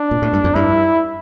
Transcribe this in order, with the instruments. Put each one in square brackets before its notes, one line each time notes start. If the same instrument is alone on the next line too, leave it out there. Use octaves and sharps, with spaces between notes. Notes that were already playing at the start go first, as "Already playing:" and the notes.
Already playing: [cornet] D4
[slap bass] A#2
A2
G2
F2
[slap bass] G2 [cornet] E4